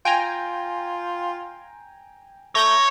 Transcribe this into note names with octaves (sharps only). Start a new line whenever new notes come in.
F4 G5 G#5 A#5
A3 C#5 A#5 G6 A#6